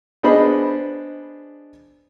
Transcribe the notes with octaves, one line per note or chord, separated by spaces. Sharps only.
B3 D4 G#4 C5 D#5 B5